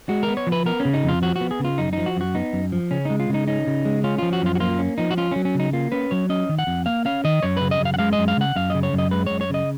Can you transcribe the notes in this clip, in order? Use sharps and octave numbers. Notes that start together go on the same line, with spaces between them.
G#3 F#4
A#4
B3
C#5
F3
B4
B3 A#4
C#4
C#3
D#4
F2 F4
F3 F#4
B3 F#4
G#4
C#3 F4
F#2 D#4
F3 D#4
F#4
F#2 F#4
B3 D#4
F#2
F3
C#3 C#4
G#3 D#4
F4
C#3 D#4
C#4 D#4
C#3
G#3
C#4 F4
F3 F4
F#4
F#2 F4
F#4
A#3 F4
C#4
F3 D#4
F#4
C#4 F4
F#3 C#4
C#4
C#3 D#4
A#3 F4
C#4 B4
F#3 C#5
C#4 D#5
D#3
F#5
F2
A#3 F5
C#4 F5
D#3 D#5
F#2 C#5
C#3 B4
D#5
F#2
F5
F#5
G#3 F5
D#5
F#2
F5
C#3 F#5
F#2 F5
C#3 D#5
C#5
F#2
D#5
G#3 B4
F#2 C#5
C#5
C#3 D#5